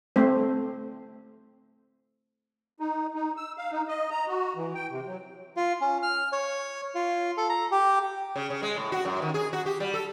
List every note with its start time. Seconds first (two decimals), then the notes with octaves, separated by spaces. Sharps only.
0.16 A3 C4 C5
2.80 D#4
3.15 D#4
3.37 E6
3.57 F5
3.71 D#4
3.88 D#5
4.11 A#5
4.27 F#4
4.56 E3
4.75 G5
4.90 C3
5.06 F#3
5.57 F4
5.81 C#4
6.02 F6
6.32 C#5
6.95 F4
7.37 A4
7.49 A#5
7.71 G4
8.36 C#3
8.50 C#3
8.63 G#3
8.76 A2
8.92 F#4
9.05 F#2
9.22 D#3
9.34 G#4
9.53 F#4
9.66 G4
9.80 G3
9.94 A4